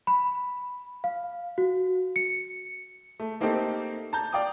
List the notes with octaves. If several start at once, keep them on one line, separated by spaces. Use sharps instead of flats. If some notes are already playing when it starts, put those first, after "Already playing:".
B5
F5
F#4
C#7
A3
A3 A#3 C4 D#4 G4 A4
A5 A#5 G6
D5 F5 G5 D6 D#6